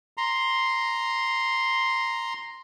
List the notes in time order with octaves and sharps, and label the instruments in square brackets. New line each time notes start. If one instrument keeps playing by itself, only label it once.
[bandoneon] A#5 C6